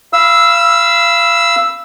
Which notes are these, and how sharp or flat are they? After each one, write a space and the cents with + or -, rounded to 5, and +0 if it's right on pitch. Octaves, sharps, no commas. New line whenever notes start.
F5 -25 B5 +0 E6 +0